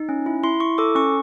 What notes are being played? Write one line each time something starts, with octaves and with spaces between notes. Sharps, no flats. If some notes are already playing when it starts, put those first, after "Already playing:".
Already playing: D#4
C#4
E4
E4 C6
E4 C#6
A4 D6
C#4 C#6